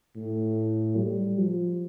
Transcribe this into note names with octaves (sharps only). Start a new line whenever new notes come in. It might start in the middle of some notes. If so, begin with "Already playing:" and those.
A2
G3
F3